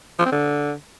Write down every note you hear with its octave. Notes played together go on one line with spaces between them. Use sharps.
F3
C4
D3